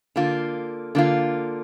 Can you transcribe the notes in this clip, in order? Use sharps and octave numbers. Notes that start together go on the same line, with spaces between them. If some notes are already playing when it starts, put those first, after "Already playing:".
D3 A#3 F4
D3 A#3 F4